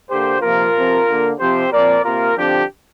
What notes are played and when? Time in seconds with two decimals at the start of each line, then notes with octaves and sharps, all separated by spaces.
0.09 D3 A#3 G4 C5
0.41 C3 F3 A#3 F4 A#4
0.74 C3 F3 C4
1.07 D3 A#3
1.39 C3 F3 C4 G4 C5
1.71 A#2 F3 C4 A#4 D5
2.05 C3 A#3 F4 A#4
2.36 D3 F3 C4 D4 G4